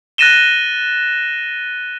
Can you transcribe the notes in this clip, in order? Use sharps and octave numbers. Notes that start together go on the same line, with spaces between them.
F#6 A6 A#6 D#7 E7 G7